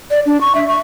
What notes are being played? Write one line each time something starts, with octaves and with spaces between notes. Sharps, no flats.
D5
D4
C#6
E5
C#6